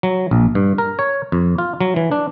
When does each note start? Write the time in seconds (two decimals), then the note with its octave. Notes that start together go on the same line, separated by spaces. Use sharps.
0.03 F#3
0.31 A#1
0.55 G2
0.78 A#4
0.99 C#5
1.32 F2
1.58 F4
1.81 F#3
1.96 E3
2.12 D4